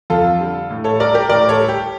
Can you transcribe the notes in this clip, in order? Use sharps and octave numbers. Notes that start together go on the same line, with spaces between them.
F2 F4 A4
D3 G3
A2
A4 C#5
G3 A#4 D5
G4 A#4
A2 A#4 D5
A4 C#5
G3
G4